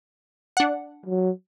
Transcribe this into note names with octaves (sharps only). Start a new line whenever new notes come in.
D4 F#5
F#3